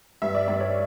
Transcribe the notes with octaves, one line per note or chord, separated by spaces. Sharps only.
G2 E5
D5
G2 D5
C#5